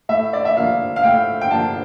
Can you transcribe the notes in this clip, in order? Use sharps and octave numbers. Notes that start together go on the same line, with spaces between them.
A2 E5
D5
E5
F3 A#3 D4 F5
F5
A2 G5
G5
F3 A#3 D4 A5